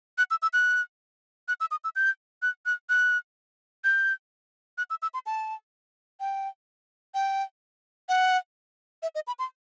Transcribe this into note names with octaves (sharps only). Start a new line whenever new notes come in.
F#6
E6
E6
F#6
F#6
E6
D#6
E6
G6
F#6
F#6
F#6
G6
F#6
E6
E6
C6
A5
G5
G5
F#5
E5
D#5
B5
C6